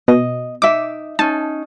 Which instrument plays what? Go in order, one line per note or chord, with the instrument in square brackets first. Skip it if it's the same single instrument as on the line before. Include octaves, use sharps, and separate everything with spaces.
[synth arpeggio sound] B2 [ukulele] D#5
[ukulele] D#4 E5 [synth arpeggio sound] D6
[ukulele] C#4 D#4 [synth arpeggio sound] A5